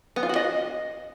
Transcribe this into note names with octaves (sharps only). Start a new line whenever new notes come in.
B3
F4
F#4
D#5